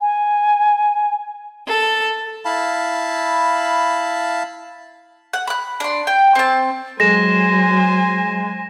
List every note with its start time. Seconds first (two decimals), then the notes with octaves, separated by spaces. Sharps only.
0.01 G#5
1.67 A4
2.45 E4 F5 A5 B5
5.33 F#5
5.47 B5 F#6
5.80 D4 C6
6.07 G5
6.35 C4 A5
7.00 F#3 G#3 C5 G#5 A#6 E7